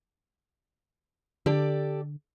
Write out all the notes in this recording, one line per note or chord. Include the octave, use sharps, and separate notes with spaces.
D3 G4 A4 D5